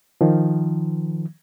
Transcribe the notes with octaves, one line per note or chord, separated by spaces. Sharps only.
D#3 F3